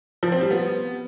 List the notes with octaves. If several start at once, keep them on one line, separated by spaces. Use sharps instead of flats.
F3
C4
G3
B3